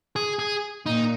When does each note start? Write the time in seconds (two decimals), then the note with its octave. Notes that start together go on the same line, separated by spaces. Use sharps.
0.16 G#4
0.39 G#4
0.86 A#2 D#4